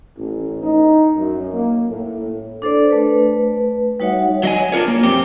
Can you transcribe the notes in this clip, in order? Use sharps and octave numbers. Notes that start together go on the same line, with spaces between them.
A1
D#4
F#2
A#3
A2
D4 A4 C5 D5
A3 B4
G3 D#4 F#4 C#5 E5 F#5
F#3 D#5 G#5
D4 F4 F#4 A#4 C#5
A#3
F#2 C4 G4